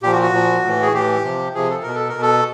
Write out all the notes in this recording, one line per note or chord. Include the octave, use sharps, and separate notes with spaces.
A#2 F3 G4
F#4
F#4
A#2 F3
A2 E3
G#4
A2 E3 G4
C3 F3
C3 F3 G#4
A4
B2 A#4
A4
A#4
B2
A4